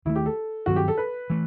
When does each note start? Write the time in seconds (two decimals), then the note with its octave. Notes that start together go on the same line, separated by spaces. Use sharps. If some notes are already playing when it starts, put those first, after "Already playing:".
0.05 D#2 D#3 A3 E4
0.16 G4
0.26 A4
0.66 G2 D#3 F#3 C4 F#4
0.76 G4
0.88 A4
0.98 B4
1.30 E3 A3